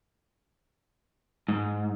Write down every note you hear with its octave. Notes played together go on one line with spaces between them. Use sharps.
G#2